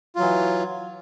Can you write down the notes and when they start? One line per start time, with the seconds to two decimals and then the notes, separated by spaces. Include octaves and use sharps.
0.16 F4
0.19 F#3
0.22 E3